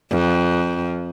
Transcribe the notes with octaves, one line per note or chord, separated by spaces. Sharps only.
F2